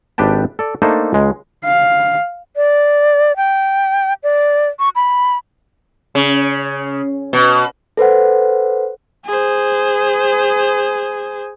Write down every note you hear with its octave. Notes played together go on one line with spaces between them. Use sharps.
G#1 D4 G4 B4 G5 A5
A4 D5
A3 A#3 D4 D#4 A4 C5
C#2 G#3
F5
D5
G5
D5
C#6
B5
C#3
B2
A4 B4 C5 F#5
G#4 C5